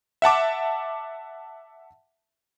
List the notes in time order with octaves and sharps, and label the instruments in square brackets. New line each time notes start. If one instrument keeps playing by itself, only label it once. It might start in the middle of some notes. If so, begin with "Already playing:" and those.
[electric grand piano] E5 F#5 A5 D6